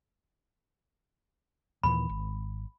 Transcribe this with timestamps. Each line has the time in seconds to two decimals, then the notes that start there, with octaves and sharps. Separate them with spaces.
1.83 D#2 A#2 E3 B5
2.09 G#1